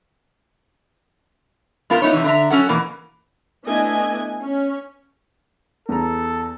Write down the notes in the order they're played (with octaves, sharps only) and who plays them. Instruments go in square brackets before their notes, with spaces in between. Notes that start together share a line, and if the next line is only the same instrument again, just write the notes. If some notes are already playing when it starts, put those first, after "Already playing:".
[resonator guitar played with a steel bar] A2 B3 F4 A#4
B3 D#4 E4 C#5
C3 E3
D3 E5 A#5
F#3 C#4 A4 F#5
B2 E3 A#3
[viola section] A3 B3 D4 E4 D#5 G#5
C#4
[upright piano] E2 A#5 [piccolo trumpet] A4